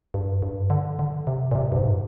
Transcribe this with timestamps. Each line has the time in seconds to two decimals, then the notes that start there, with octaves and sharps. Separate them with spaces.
0.14 G2
0.43 G2
0.70 D3
0.99 D3
1.27 C3
1.51 A#2
1.55 C3
1.72 G2
1.76 G#2